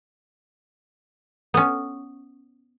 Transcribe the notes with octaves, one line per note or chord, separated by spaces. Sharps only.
B3 C#4